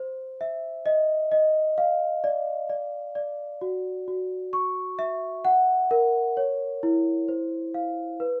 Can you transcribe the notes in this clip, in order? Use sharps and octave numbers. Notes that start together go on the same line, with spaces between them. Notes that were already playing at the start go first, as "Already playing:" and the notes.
Already playing: C5
E5
D#5
D#5
F5
D5
D5
D5
F#4
F#4
C#6
E5
F#5
A#4
C#5
E4
C5
F5
B4